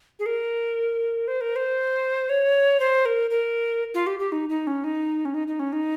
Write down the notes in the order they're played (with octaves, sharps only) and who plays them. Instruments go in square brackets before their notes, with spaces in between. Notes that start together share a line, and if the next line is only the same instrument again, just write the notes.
[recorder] G#4
A#4
C5
A#4
C5
C#5
C5
A#4
A#4
F4
G4
G4
D#4
D#4
C#4
D#4
C#4
D#4
D#4
C#4
D#4